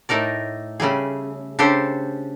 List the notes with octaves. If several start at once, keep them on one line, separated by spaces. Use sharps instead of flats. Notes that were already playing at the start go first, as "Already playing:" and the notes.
A2 A3 D#4 A#4 D5
C#3 G3 A3 G#4
C#3 D4 G4 A4 C5